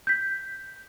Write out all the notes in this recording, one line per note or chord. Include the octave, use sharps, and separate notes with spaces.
G6 B6